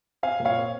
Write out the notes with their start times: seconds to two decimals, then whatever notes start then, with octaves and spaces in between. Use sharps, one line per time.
0.23 C4 F5 G#5
0.40 A#2
0.45 C#5 F5
0.56 C4